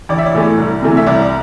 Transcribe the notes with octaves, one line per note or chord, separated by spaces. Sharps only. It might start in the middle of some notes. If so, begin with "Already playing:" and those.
A1 D5
E5
D5
A2 E3 A3
C2
C3 E3 A3
E5
C2 D5